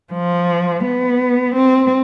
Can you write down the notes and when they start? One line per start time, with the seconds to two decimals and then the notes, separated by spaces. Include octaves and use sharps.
0.13 F3
0.84 B3
1.55 C4